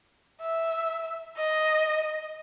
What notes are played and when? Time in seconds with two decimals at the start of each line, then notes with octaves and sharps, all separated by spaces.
0.41 E5
1.38 D#5